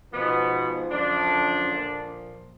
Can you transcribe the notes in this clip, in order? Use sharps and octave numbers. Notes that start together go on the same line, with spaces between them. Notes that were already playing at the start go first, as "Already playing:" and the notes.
G#2 B2 F3 B3
F#2 D3 F3 D4
A#2 F3